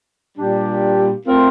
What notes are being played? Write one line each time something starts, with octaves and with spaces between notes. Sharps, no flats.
A#2 G3 D4 G4
A3 C4 F4 A#4